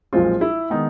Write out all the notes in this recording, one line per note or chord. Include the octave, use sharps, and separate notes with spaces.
B1 A#2 F3 G#3 C4 F4
E4
D#3 G#3 B3 D#4